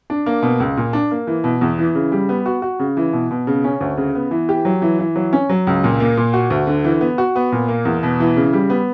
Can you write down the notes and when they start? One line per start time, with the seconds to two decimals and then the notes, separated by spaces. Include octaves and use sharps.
0.10 D4
0.26 A#3
0.42 B2
0.60 C#2
0.77 A#2
0.93 D4
1.11 A#3
1.27 E3
1.44 B2
1.61 E2
1.79 E3
1.95 C#3
2.12 G3
2.29 B3
2.46 F#4
2.62 F#4
2.79 C#3
2.97 E3
3.13 B2
3.31 B2
3.47 C#3
3.64 C#4
3.81 D2
3.97 C#3
4.15 B3
4.31 E3
4.49 G4
4.65 F#3
4.82 E3
4.99 E3
5.16 F#3
5.33 C#4
5.49 F#3
5.67 C#2
5.84 A#2
6.00 A#3
6.17 A#2
6.34 F#4
6.50 D2
6.67 D3
6.84 E3
7.01 B3
7.18 F#4
7.36 B3
7.52 A#2
7.68 A#3
7.85 E2
8.03 B2
8.20 E3
8.36 C#3
8.53 G3
8.70 B3